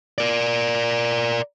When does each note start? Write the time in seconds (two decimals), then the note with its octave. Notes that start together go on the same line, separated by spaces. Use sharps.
0.18 A#4 D5